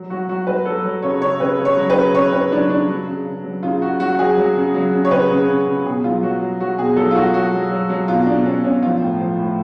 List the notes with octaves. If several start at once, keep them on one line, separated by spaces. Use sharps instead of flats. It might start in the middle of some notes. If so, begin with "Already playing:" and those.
Already playing: F#3
F#3 F#4
F#3 F#4
F#3 B4
F#3 A4
F#3
C#3 C#5
C#3 C#5
C#3 B4
C#3
C#5
F#3
B4
C#3
C#3 C#5
C#3 B4
F#3 D4
C#3 D4
F#3
C#3
C#3
F#3
C#3 F4
C#3 F#4
F#3 F#4
F#4
F#3 G#4
F#3
C#3
F#3
C#3
C#5
C#3 B4
C#3
C#3
C#3
B2 G#4
F#3 F4
F#3 F#4
F#3
F#3 F#4
B2 G#4
F#3 A4
F4
F#3 F#4
F#3 F#4
F#3
F#3
F#3
B2 F4
B2 D4
B2 C#4
B2 C#4
F3 F4
A2
F3
A2